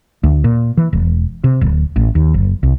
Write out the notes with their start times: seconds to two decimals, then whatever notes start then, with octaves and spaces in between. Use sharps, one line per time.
0.24 D2
0.44 A#2
0.77 E3
0.93 E1
1.44 C3
1.61 D1
1.96 A1
2.15 D#2
2.34 F#1
2.63 C2